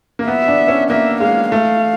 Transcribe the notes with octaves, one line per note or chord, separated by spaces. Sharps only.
A#3
B3 E5
D4
C#4
A#3 E5
G#3 F5
A3 F5